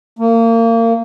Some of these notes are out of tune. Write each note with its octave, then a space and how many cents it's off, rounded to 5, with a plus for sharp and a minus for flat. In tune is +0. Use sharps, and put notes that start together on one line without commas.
A#3 -30